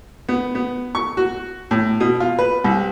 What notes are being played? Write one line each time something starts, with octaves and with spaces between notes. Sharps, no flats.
B3
B3
C#6
F#4
A2
B2
F4
B4
C2